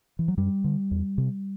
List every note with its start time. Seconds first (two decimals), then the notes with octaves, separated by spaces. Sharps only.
0.19 E3
0.28 F#3
0.37 F#2 G3
0.64 D3
0.91 E2
1.18 C3